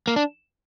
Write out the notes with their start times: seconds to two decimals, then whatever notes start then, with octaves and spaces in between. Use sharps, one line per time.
0.07 A#3
0.16 D4